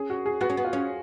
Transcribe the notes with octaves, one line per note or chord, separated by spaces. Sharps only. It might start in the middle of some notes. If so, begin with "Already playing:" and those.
Already playing: C#4 G#4
F#4
G#4
B3 F#4
C#4
B3
F4
C#4